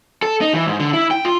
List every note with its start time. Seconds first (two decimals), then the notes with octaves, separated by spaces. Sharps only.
0.22 A4
0.41 D#4
0.54 E3
0.67 G#2
0.79 D3
0.93 E4
1.11 G5
1.25 F4